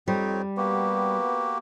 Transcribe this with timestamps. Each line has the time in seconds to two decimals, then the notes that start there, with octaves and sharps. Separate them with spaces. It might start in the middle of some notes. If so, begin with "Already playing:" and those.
0.08 F2 G3 C4 D#4 C#5
0.57 A#3 B3 F#4 G4